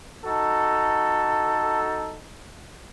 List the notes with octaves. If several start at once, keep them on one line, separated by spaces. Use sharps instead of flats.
D#4 F#4 A4